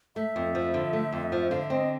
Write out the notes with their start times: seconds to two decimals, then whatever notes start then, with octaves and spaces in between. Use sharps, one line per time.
0.16 A3 E5
0.36 F2
0.55 F3
0.74 D3
0.93 A3
1.12 F2
1.32 F3
1.50 D3 F5
1.60 E5
1.70 C4 D#5